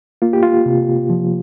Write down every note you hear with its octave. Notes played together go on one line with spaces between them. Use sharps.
A#3 F4
G4
F4
C3
F3